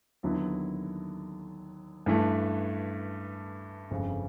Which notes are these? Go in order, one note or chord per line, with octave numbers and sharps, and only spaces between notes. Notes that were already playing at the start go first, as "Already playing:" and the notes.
D#2 D3 F#3 B3 E4
G2 E3 A3
G1 F2 C#3